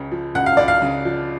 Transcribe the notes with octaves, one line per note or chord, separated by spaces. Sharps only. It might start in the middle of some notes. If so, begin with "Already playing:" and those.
Already playing: C#2 C#3
F3
C#2 F#5
F5
C#2 D5
F5
C#3
F3